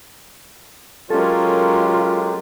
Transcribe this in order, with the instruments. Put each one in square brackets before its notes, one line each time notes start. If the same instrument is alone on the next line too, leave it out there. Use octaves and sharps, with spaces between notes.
[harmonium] F#3 G#3 G4 [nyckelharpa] C#4 A#4 [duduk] F4 [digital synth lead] A4